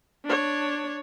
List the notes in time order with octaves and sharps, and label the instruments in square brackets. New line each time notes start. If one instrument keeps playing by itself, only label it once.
[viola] D4 C#5